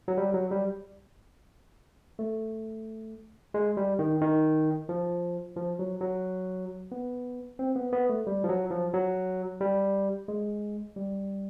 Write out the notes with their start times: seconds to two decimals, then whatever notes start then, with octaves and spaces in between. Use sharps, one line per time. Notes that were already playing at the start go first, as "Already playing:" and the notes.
0.08 F#3
0.17 G3
0.34 F#3
0.51 G3
2.19 A3
3.54 G#3
3.77 G3
3.99 D#3
4.22 D#3
4.89 F3
5.56 F3
5.79 F#3
6.01 F#3
6.92 B3
7.59 C4
7.76 B3
7.93 B3
8.09 A3
8.27 G3
8.44 F3
8.49 F#3
8.71 F3
8.94 F#3
9.60 G3
10.28 G#3
10.96 G3